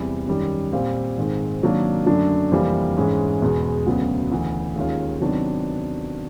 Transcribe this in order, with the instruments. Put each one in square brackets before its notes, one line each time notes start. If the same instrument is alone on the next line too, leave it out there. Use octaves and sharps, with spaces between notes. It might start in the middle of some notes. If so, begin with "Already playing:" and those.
Already playing: [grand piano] E2 C3 E3 G3
F#2 D#3 G3
A#2 G3 C4 F4
G#2 D#3 G#3 C4
C3 D#3 F#3 A#3 D4
F#2 D3 F#3 A3 D4
F2 C3 E3 G3 A#3
G#2 E3 G#3 C#4
E2 B2 G#3 B3
D2 C#3 F#3 B3
D2 C#3 E3
D#2 D#3 G#3 C#4 F4
C3 D#3 F#3 B3 D4